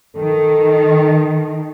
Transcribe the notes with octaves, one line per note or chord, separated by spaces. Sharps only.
D#3 A4